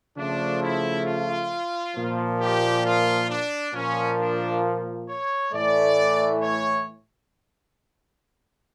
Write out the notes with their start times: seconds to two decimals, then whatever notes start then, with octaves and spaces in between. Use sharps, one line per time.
0.16 C#3 F3 A3 D4
0.61 E4
1.06 F4
1.95 A#2 F3 A#3
2.40 G4
2.84 F4
3.29 D4
3.74 A#2 F3 A#3 C#4
4.19 D4
5.08 C#5
5.52 A2 E3 A3 D5
6.41 C#5